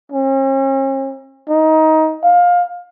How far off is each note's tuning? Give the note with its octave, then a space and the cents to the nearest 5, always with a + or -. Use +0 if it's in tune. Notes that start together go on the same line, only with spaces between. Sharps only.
C#4 -45
D#4 +20
F5 +20